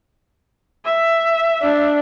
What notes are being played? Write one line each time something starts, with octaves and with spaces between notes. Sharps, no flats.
E5
D4